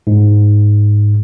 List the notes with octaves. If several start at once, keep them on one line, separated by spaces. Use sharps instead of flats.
G#2